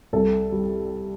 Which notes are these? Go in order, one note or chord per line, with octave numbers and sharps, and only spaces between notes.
C2 A4
G3